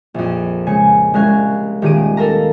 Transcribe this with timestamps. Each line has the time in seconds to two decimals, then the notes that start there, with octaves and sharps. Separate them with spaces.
0.14 A#1 F2
0.67 C#3 G#3 G#5 C#7
1.14 C2 G#3 C#4 F5 F#6 G#6
1.82 D#1 D#3 G4 G#4 D7 D#7
2.17 A4 A#4 F5 A#5